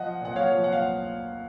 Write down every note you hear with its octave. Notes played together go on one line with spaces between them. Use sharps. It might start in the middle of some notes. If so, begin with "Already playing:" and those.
Already playing: F3 D#5 F#5
A#2 F#5
C#5 F5
F3
F#5
F5